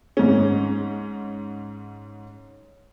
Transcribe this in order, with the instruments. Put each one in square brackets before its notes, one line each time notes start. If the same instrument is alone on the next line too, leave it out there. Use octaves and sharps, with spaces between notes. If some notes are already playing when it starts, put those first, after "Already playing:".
[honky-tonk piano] G#2 C#4